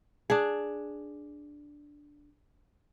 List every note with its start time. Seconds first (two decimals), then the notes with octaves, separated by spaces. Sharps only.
0.30 D4 G#4